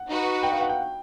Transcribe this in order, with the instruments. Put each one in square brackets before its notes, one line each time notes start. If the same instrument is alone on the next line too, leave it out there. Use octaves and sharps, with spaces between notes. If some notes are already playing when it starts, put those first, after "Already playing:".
Already playing: [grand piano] F#5
[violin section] D#4 F#4 B4
[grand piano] G5
F5
F#5
G5